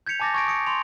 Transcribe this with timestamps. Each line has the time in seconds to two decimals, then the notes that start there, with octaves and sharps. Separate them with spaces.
0.06 G6 G#6 B6 C#7 F7
0.20 G#5 A5 D6 A6 A#6
0.34 C#6 D#6 G#6 A#6 D7
0.48 D#6 A#6 C#7 D7
0.66 C6 D7 F7